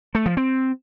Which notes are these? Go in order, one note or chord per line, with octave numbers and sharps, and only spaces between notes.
A3
F3
C4